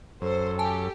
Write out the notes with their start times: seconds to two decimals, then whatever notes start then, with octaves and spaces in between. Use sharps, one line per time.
0.22 F#2 A4 C5
0.59 G4 G#5 A5